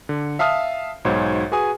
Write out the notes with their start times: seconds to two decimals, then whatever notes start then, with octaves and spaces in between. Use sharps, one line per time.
0.09 D3
0.39 E5 F5 A5 D#6 F6
1.05 B1 G#2 F#4 C5 C#5
1.52 F#4 G#4 B4 G#5 D#6